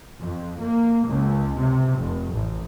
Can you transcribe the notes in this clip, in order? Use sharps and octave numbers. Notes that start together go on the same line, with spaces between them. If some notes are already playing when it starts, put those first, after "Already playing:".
F2
A#3
C#2
C3
F1
A1